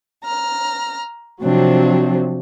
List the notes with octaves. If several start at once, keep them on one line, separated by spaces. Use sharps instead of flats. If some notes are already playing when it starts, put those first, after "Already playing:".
A#5 F6
C3 F3 F#3 C4 D4